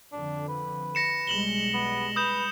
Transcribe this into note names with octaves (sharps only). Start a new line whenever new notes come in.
F2 D3 D4
B4
A#6 C#7 E7
B1 G3 G#3 E7 F#7 G7
B3
B4 D#6 G6 E7